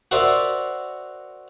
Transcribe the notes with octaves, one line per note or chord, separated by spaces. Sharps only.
F#4 A#4 C5 D5 E5